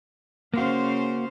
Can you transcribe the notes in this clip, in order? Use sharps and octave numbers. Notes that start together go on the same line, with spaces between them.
C#3 A#3 F#4 C5 F5